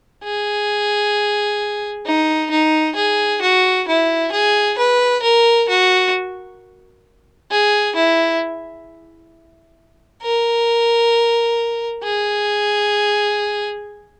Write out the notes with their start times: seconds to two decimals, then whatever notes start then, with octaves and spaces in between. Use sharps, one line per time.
0.23 G#4
2.06 D#4
2.51 D#4
2.96 G#4
3.42 F#4
3.88 E4
4.32 G#4
4.78 B4
5.23 A#4
5.69 F#4
7.51 G#4
7.96 E4
10.22 A#4
12.04 G#4